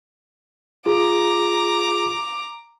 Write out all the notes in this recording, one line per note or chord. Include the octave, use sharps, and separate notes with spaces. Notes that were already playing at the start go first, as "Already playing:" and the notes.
F4 G#4 A#5 D6